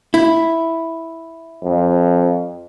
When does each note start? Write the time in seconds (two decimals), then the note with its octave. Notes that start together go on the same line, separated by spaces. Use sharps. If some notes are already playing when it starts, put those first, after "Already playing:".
0.14 E4
1.64 F2